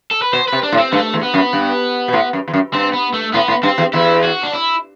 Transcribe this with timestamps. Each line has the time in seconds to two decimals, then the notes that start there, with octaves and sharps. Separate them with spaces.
0.11 A4
0.22 B4
0.33 B2 C5
0.48 C3 B4
0.63 D4
0.72 A2
0.78 C4
0.92 G2 A3
1.14 E2
1.23 B3
1.34 F#2
1.53 G2
2.08 B2
2.13 A2
2.33 F#2
2.48 E2
2.53 F#2
2.74 G2 C4
2.93 B3
3.13 A3
3.33 A2 B3
3.48 A2
3.63 G2 C4
3.78 E2
3.93 E2 E4
4.24 F#4
4.43 D4
4.53 E4